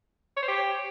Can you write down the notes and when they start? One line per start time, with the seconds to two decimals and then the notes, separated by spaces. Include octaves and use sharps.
0.37 C#5
0.43 C5
0.48 G4